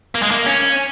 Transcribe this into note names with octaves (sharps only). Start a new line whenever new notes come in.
A#3
G#3
A#3
C#4